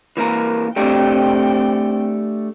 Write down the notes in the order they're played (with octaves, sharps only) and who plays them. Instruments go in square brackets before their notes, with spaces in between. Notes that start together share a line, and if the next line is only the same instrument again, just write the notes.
[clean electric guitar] E3 A#3 A#4
[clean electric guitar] A3 D4 G4 [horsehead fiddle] C4 G5